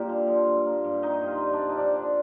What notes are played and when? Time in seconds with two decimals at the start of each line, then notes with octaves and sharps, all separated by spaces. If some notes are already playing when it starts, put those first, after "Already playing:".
Already playing: A#2 G3 A#3 G4
0.09 D3
0.27 F3
0.46 G2
0.65 A#3
0.84 G2
1.02 D#3 D#4
1.22 C3
1.27 F4
1.40 G3
1.53 D4
1.59 C3
1.69 D#4
1.78 F3 D4
1.97 D3